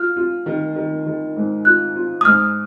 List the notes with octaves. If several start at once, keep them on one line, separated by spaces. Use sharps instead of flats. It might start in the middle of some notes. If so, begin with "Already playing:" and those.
Already playing: F4 F6
F4
D#3
D#3
D#3
G#2
F4 F#6
F4
D#6
G#2 F6